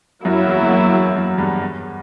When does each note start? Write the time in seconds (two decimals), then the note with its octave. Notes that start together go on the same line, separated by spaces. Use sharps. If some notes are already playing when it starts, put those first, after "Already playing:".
0.25 F#2 F#3 A#3 E4
0.47 E2
0.62 E2
0.70 F#2
0.93 E2
1.16 F#2
1.38 E2 G2
1.61 E2